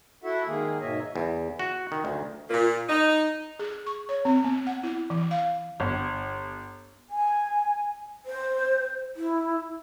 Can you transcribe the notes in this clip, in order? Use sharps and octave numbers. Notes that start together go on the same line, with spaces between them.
E4 F#4 A4 E5 F#5
D#3 G#3 A#3 G#4
G#2 B2 A#3 C#5 D#5 E5
E2
F#4
D#3
D2
A#2
D#4
G#4
C#6
C#5
C4
B3
F#5
E4
E3
F5
G1
G#5
C5
E4